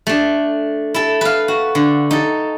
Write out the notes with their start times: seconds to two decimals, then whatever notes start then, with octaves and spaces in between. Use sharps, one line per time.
0.07 A3 D4
0.94 E4 A4
1.21 B4 F5
1.48 F#4
1.75 D3
2.11 D#4 A4